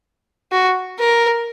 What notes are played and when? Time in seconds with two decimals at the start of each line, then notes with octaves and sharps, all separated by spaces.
0.52 F#4
0.99 A#4